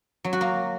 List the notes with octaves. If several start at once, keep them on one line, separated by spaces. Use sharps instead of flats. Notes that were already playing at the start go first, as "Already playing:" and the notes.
F#3
F#4
A#3